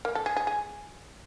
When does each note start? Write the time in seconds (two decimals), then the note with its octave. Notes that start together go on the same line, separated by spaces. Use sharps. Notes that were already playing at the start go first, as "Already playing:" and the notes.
0.05 A#3
0.15 A4
0.26 G#4
0.37 G#4
0.47 G#4